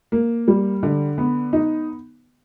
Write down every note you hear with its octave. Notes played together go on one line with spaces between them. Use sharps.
A#3
G3
D3
B3
D#4